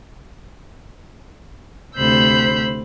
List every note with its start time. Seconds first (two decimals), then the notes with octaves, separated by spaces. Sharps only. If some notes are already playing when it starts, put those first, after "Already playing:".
1.95 D2 C3 C5 B5 E6 G6